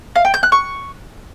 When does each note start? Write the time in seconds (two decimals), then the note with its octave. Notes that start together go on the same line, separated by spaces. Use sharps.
0.16 F5
0.25 G5
0.34 G6
0.43 F#6
0.52 C#6